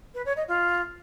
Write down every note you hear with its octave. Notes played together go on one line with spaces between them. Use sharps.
B4
C#5
D#5
F4